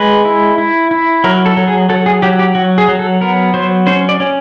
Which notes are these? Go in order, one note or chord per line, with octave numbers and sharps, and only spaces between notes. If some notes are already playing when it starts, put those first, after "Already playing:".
Already playing: G#3 B4
E4
E4
E4
F#3 A#4
A4
F#3
G#4
F#3 A4
G#4
F#3 G4
G4
F#3 F#4
G#4
F#3
A4
B3 A#4
F#3 C5
C#4 C5
D5
C#4